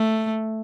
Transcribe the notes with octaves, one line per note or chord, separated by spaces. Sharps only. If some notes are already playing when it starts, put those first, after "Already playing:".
Already playing: A3